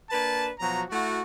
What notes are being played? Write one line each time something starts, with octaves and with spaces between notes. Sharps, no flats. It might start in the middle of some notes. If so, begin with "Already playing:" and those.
A#3 D4 B4 A5
B2 F3 F#3 F#4 A#5
A3 E4 F#4